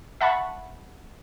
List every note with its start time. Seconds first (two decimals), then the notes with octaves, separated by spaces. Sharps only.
0.21 E5 F#5 A5 B5 C#6